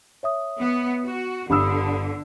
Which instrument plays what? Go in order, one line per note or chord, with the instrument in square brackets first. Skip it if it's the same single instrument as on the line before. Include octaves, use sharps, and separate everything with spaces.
[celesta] C#5 E5 D#6
[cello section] B3
F#4
[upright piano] G1 E6 [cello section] D3 [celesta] G4 B5 D#6